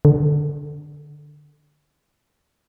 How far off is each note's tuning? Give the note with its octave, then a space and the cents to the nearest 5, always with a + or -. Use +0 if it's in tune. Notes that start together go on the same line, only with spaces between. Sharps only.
D3 +15